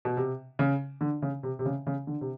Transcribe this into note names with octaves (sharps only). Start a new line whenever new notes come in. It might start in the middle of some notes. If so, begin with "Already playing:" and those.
B2
C3
C#3
D3
C#3
C3
C3
C#3
C#3
D3
C3